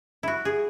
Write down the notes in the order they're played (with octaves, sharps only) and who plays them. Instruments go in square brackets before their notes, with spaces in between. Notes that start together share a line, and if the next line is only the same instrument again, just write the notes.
[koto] E4 F#4
G#4